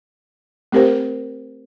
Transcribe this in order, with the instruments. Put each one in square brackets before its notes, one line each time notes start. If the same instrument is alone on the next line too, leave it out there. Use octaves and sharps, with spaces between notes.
[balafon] A3 C4 G4 A#4 C5